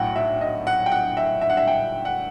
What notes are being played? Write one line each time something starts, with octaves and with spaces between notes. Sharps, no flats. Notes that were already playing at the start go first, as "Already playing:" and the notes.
Already playing: B1 A2 F#5 G5
E5
D#5
F#5
G5
F#5
E5
E5
F#5
E5
G5
F#5